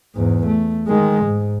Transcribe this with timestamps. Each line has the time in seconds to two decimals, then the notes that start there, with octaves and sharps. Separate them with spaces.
0.15 E2 G#2
0.46 A3
0.88 D#3 G#3
1.25 G#2